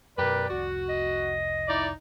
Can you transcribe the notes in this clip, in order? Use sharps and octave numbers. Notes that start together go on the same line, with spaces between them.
F#2 B2 G4 A#4 B4 D5
F1 C2 F#4
D#5
D#4 E4 D5